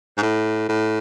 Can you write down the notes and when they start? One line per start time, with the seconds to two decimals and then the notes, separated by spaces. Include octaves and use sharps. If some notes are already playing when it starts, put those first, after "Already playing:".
0.17 G#2
0.22 A2
0.69 A2